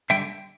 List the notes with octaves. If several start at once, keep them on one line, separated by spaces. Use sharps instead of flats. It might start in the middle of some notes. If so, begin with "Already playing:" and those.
D3 G3 E5 G5